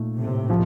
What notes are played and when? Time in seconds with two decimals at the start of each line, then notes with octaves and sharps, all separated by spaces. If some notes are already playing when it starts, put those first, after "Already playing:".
Already playing: A#2 A3 D#4
0.19 A2 C3
0.50 F3